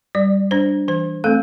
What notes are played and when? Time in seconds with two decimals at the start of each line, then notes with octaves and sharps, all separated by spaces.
0.15 G3 D5
0.51 D4 C5
0.88 E3 C5
1.24 A3 C4 A4